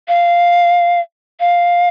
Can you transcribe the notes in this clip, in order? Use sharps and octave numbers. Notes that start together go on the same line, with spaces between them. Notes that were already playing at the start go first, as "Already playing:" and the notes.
F5
F5